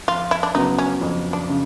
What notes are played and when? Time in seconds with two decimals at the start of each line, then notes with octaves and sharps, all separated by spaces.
0.08 F2 F4
0.31 E4
0.43 D4
0.55 C#3 F#3 B3 D#4
0.78 C#4
1.01 F2
1.33 D4
1.49 C#3